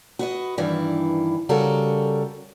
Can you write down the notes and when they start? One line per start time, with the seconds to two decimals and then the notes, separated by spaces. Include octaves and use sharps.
0.19 F#4 B4 D#5
0.58 G2 D#3 E3 D4
1.49 C#3 G3 F#4 A4 A#4